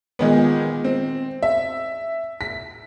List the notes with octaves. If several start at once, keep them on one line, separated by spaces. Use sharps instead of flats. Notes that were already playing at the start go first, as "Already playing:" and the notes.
A#2 D#3 G#3 B3
C4
E5
B6